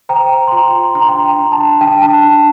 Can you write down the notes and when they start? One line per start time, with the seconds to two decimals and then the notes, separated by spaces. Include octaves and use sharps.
0.09 C5 G5 A#5
0.48 C6
0.51 F4 G5 A#5
0.95 D4 A#5
1.02 C6
1.09 G5 A#5
1.23 G5 A#5
1.38 D4
1.52 A5
1.81 D4 G5
2.02 A5
2.23 D4